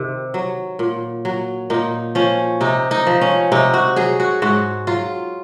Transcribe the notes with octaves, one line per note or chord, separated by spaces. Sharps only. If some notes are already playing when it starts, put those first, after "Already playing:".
Already playing: C3 D#3
F#3
A#2
F#3
A#2 D#4
F3 C#4
C3 D#4
D#4
F3
C#4
C3 D#4
F#4
F#3 G#4
F#4
G#2 F#4
F#3 F4